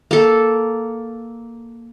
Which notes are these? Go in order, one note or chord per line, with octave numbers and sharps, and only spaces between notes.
A#3 A4